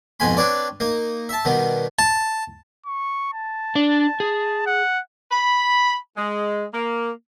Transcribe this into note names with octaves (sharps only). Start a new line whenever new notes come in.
F2 G#2 B2 F4 G#5 B5
C4 D4 B4 C#5 D5
A#3 D#4
E5 A5
B2 D#3 G3 B3
A5
C#6
A5
D4 D5
G#4
F#5
B5
G#3
A#3